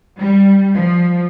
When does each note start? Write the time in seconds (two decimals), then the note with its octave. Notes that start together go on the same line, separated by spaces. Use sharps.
0.18 G3
0.75 F3